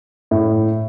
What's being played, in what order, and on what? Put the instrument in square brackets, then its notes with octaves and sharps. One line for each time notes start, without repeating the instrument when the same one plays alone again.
[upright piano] A2